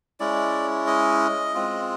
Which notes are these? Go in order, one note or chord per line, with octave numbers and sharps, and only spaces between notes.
G#3 C#4 E4 D5
D#5
G#3 C4 F4